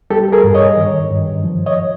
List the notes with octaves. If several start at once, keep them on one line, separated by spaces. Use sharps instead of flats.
G3 G4 A4
G#4 A#4
G2
C#5 D#5
D#3
G2
F3
C#5 D#5